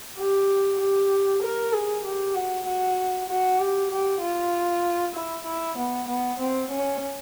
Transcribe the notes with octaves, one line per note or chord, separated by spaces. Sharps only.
G4
G4
A#4
G#4
G4
F#4
F#4
F#4
G4
G4
F4
E4
E4
B3
B3
C4
C#4